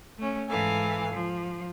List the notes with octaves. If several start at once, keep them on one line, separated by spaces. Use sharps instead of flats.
A3 C#4
G#2 E3 A4 F5 G#5
F3